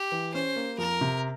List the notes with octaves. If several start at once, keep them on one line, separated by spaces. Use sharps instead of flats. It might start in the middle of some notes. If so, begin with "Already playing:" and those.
Already playing: G4
E3
C#4 C5
A#3
F2 A#4
C3